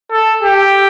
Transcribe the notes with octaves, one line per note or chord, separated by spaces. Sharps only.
A4
G4